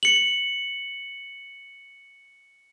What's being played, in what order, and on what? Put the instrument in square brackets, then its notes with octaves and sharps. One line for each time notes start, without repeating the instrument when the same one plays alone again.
[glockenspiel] C#7 F#7